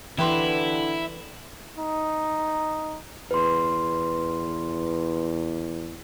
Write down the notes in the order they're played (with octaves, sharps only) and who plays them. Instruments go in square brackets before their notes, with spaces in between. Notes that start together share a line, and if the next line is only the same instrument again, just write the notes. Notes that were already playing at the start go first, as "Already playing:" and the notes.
[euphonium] D3 [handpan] E3 [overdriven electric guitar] E4 [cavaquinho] G4 B4 C6
[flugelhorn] D#4
[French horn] E2 [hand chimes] B4 C6